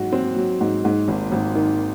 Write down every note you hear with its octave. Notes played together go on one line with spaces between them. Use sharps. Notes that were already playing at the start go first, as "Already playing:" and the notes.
Already playing: G#2 F#3 F#4
C4
F#3
G#2
G#2
G#1
G#1
D#3